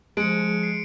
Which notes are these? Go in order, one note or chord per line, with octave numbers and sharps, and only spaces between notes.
F3 G#3 C#7 D7
C7